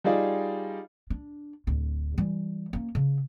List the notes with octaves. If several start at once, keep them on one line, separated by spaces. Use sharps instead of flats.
G3 D#4 F4 G#4 D5
D4
D1 D2
E3 G3
A#3 C#4
C#3